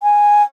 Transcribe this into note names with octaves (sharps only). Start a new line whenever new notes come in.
G#5